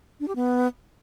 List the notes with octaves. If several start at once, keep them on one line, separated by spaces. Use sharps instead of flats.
D4
G4
B3